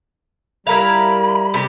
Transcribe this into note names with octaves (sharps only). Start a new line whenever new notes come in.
G3 E4 A#4 F5 B5
C3 G4